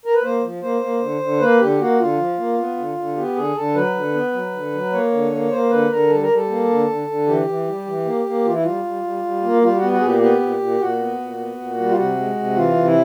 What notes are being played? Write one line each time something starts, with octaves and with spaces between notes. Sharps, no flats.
A#4
B4
A#3 C5
F3
A#3 C5
A#3
D3
D3
A#3 B4
D3 G4
A#3 F#4
D3 F4
F3
A#3
B3
D3
D3
B3 G4
D3 G#4
D3 A4
F#3 B4
D3
B3
F#3
D3
F#3
A#3 C#5
D3
A#3
A#3 C5
D3 B4
D3 A#4
G3 A4
A#4
G3
A4
A#3
D3
D3
D3
E3 G4
E3
G3
E3
A#3
A#3
E3 F4
E4
G3 F4
G3
G3
G3
A#3
G3 F4
F#4
B3
F#4
A#2 G#4
G4
B3 G4
A#2
A#2
A#2 F#4
B3
A#2
B3
A#2
G3
F4
C3 F#4
G#3
C3
E3 F4
C3
E4